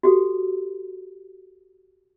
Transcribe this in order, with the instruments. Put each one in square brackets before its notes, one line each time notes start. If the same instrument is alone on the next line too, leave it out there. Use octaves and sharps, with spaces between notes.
[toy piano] F#4 G4 A4